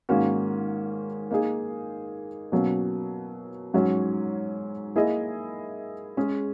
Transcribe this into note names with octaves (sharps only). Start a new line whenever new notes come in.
G#2 D#3 A#3 C#4 F#4
A#3 D#4 G#4
B2 F#3 A#3 C#4
G#2 F#3 C#4 F#4 C#5
A#3 E4 G#4 D#5
G#3 C#4 G#4